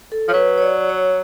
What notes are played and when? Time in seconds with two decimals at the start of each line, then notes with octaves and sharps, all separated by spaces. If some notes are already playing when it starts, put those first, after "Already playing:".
0.12 A4
0.28 F3 C#5
0.33 F#3 B4
0.58 C#5
0.62 D5
0.89 C#5